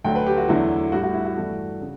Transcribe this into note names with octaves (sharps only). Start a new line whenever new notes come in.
D2 D3 F#3 A3 G5
B4
G4
F#4
E2 D3 F#3 A3 E4
A2 G3 F#4
F#4
E4
F#4
G2 E3 A3
C#3